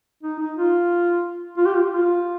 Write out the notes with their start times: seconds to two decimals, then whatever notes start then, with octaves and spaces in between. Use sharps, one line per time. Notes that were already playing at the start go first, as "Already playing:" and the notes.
0.23 D#4
0.40 D#4
0.57 F4
1.57 F4
1.66 G4
1.75 F4
1.92 F4